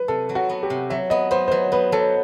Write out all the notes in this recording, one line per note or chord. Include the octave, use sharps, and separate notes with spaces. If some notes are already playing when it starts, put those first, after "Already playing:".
Already playing: B4
C3 A4
F#3
F#4
B3
G4
C3
F#3 E5
B3 D#5
B3 C5
C5
F#3 B4
B3 B4
F#3 A4